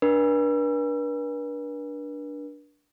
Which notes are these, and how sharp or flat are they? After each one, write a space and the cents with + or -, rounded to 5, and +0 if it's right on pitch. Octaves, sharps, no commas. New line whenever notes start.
D4 +0 B4 -45